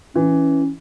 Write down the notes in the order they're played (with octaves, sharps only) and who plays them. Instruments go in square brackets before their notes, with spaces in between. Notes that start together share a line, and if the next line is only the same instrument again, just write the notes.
[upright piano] E3 [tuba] C#4